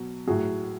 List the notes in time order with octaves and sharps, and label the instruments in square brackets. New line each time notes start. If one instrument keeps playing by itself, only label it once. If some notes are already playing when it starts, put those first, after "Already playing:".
Already playing: [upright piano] B2 F#3
A2 F#3 F#4 G#4